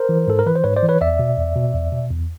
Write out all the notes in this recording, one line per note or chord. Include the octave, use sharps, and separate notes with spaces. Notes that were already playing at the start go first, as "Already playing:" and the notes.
Already playing: A#4 C5
E3
G#2 A4
A#4
E3 B4
C5
G#2 B4 C#5
C5 D5
E3
B4 C#5
E2 D5 E5
B2
E2
B2
E2
B2
E2